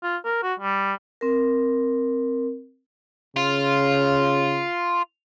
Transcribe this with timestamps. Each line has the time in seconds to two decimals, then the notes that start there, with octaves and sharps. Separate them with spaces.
0.03 F4
0.25 A#4
0.43 F#4
0.60 G3
1.21 C4 A#4
3.36 C#3 F4